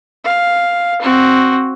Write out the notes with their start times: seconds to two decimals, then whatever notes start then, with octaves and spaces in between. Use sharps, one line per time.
0.25 F5
1.01 C4 F#4